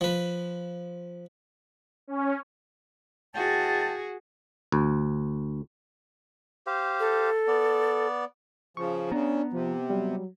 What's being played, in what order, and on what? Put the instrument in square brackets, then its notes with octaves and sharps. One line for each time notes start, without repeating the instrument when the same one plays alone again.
[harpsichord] F3 B4
[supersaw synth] C#4
[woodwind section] E2 G5 A5 [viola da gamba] F#4 G#4
[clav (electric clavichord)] D2
[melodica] G4 C5 F5
[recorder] A4
[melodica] B3 D5
[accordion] C#3 F3 [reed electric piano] C#6
[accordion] C#3 [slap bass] B3 [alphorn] D4 [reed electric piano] A#5
[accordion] C3 [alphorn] F3
[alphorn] F#3 [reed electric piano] G3